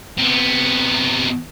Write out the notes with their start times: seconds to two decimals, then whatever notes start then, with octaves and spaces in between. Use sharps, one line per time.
0.18 C3 B3